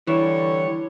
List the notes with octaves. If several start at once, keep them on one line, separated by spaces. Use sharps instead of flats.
D3 E3 G3 C#5